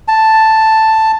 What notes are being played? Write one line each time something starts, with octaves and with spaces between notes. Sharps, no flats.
A5